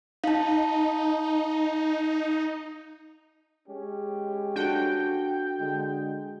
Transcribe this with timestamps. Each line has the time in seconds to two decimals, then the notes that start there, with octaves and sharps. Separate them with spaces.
0.24 D#4 F5 A5
3.68 G#3 C#4 G4
4.56 D4 F#4 A4 G5
5.60 D3 G#3